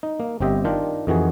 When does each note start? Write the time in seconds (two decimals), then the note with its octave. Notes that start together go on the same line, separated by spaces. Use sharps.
0.03 D#4
0.20 A#3
0.40 G1 C4 G4 D#5 E5
0.65 D#3 D4 F4 G5
1.07 F2 D#3 E3 F#4 G#4